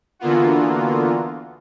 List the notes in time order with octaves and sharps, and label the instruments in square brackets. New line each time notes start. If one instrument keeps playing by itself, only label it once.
[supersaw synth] D3 E3 A#3 B3 F4 F#4